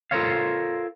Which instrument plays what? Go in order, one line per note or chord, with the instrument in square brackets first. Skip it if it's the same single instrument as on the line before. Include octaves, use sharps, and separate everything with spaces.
[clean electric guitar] F4 A4 A#4 C5 C#5 F5